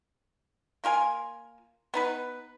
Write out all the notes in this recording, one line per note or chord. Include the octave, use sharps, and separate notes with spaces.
A#3 F4 A#4 G#5
B3 D#4 B4